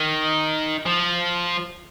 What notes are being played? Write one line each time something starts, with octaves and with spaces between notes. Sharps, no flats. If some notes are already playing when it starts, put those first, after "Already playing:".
Already playing: D#3
F3